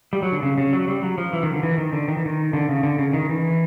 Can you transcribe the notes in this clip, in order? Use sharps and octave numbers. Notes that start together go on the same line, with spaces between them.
G3
F#3
D3
C#3
C#3
F#3
G3
F#3
F3
E3
D#3
D3
E3
D#3
D3
D#3
E3
D#3
D3
C#3
D3
C#3
D#3
E3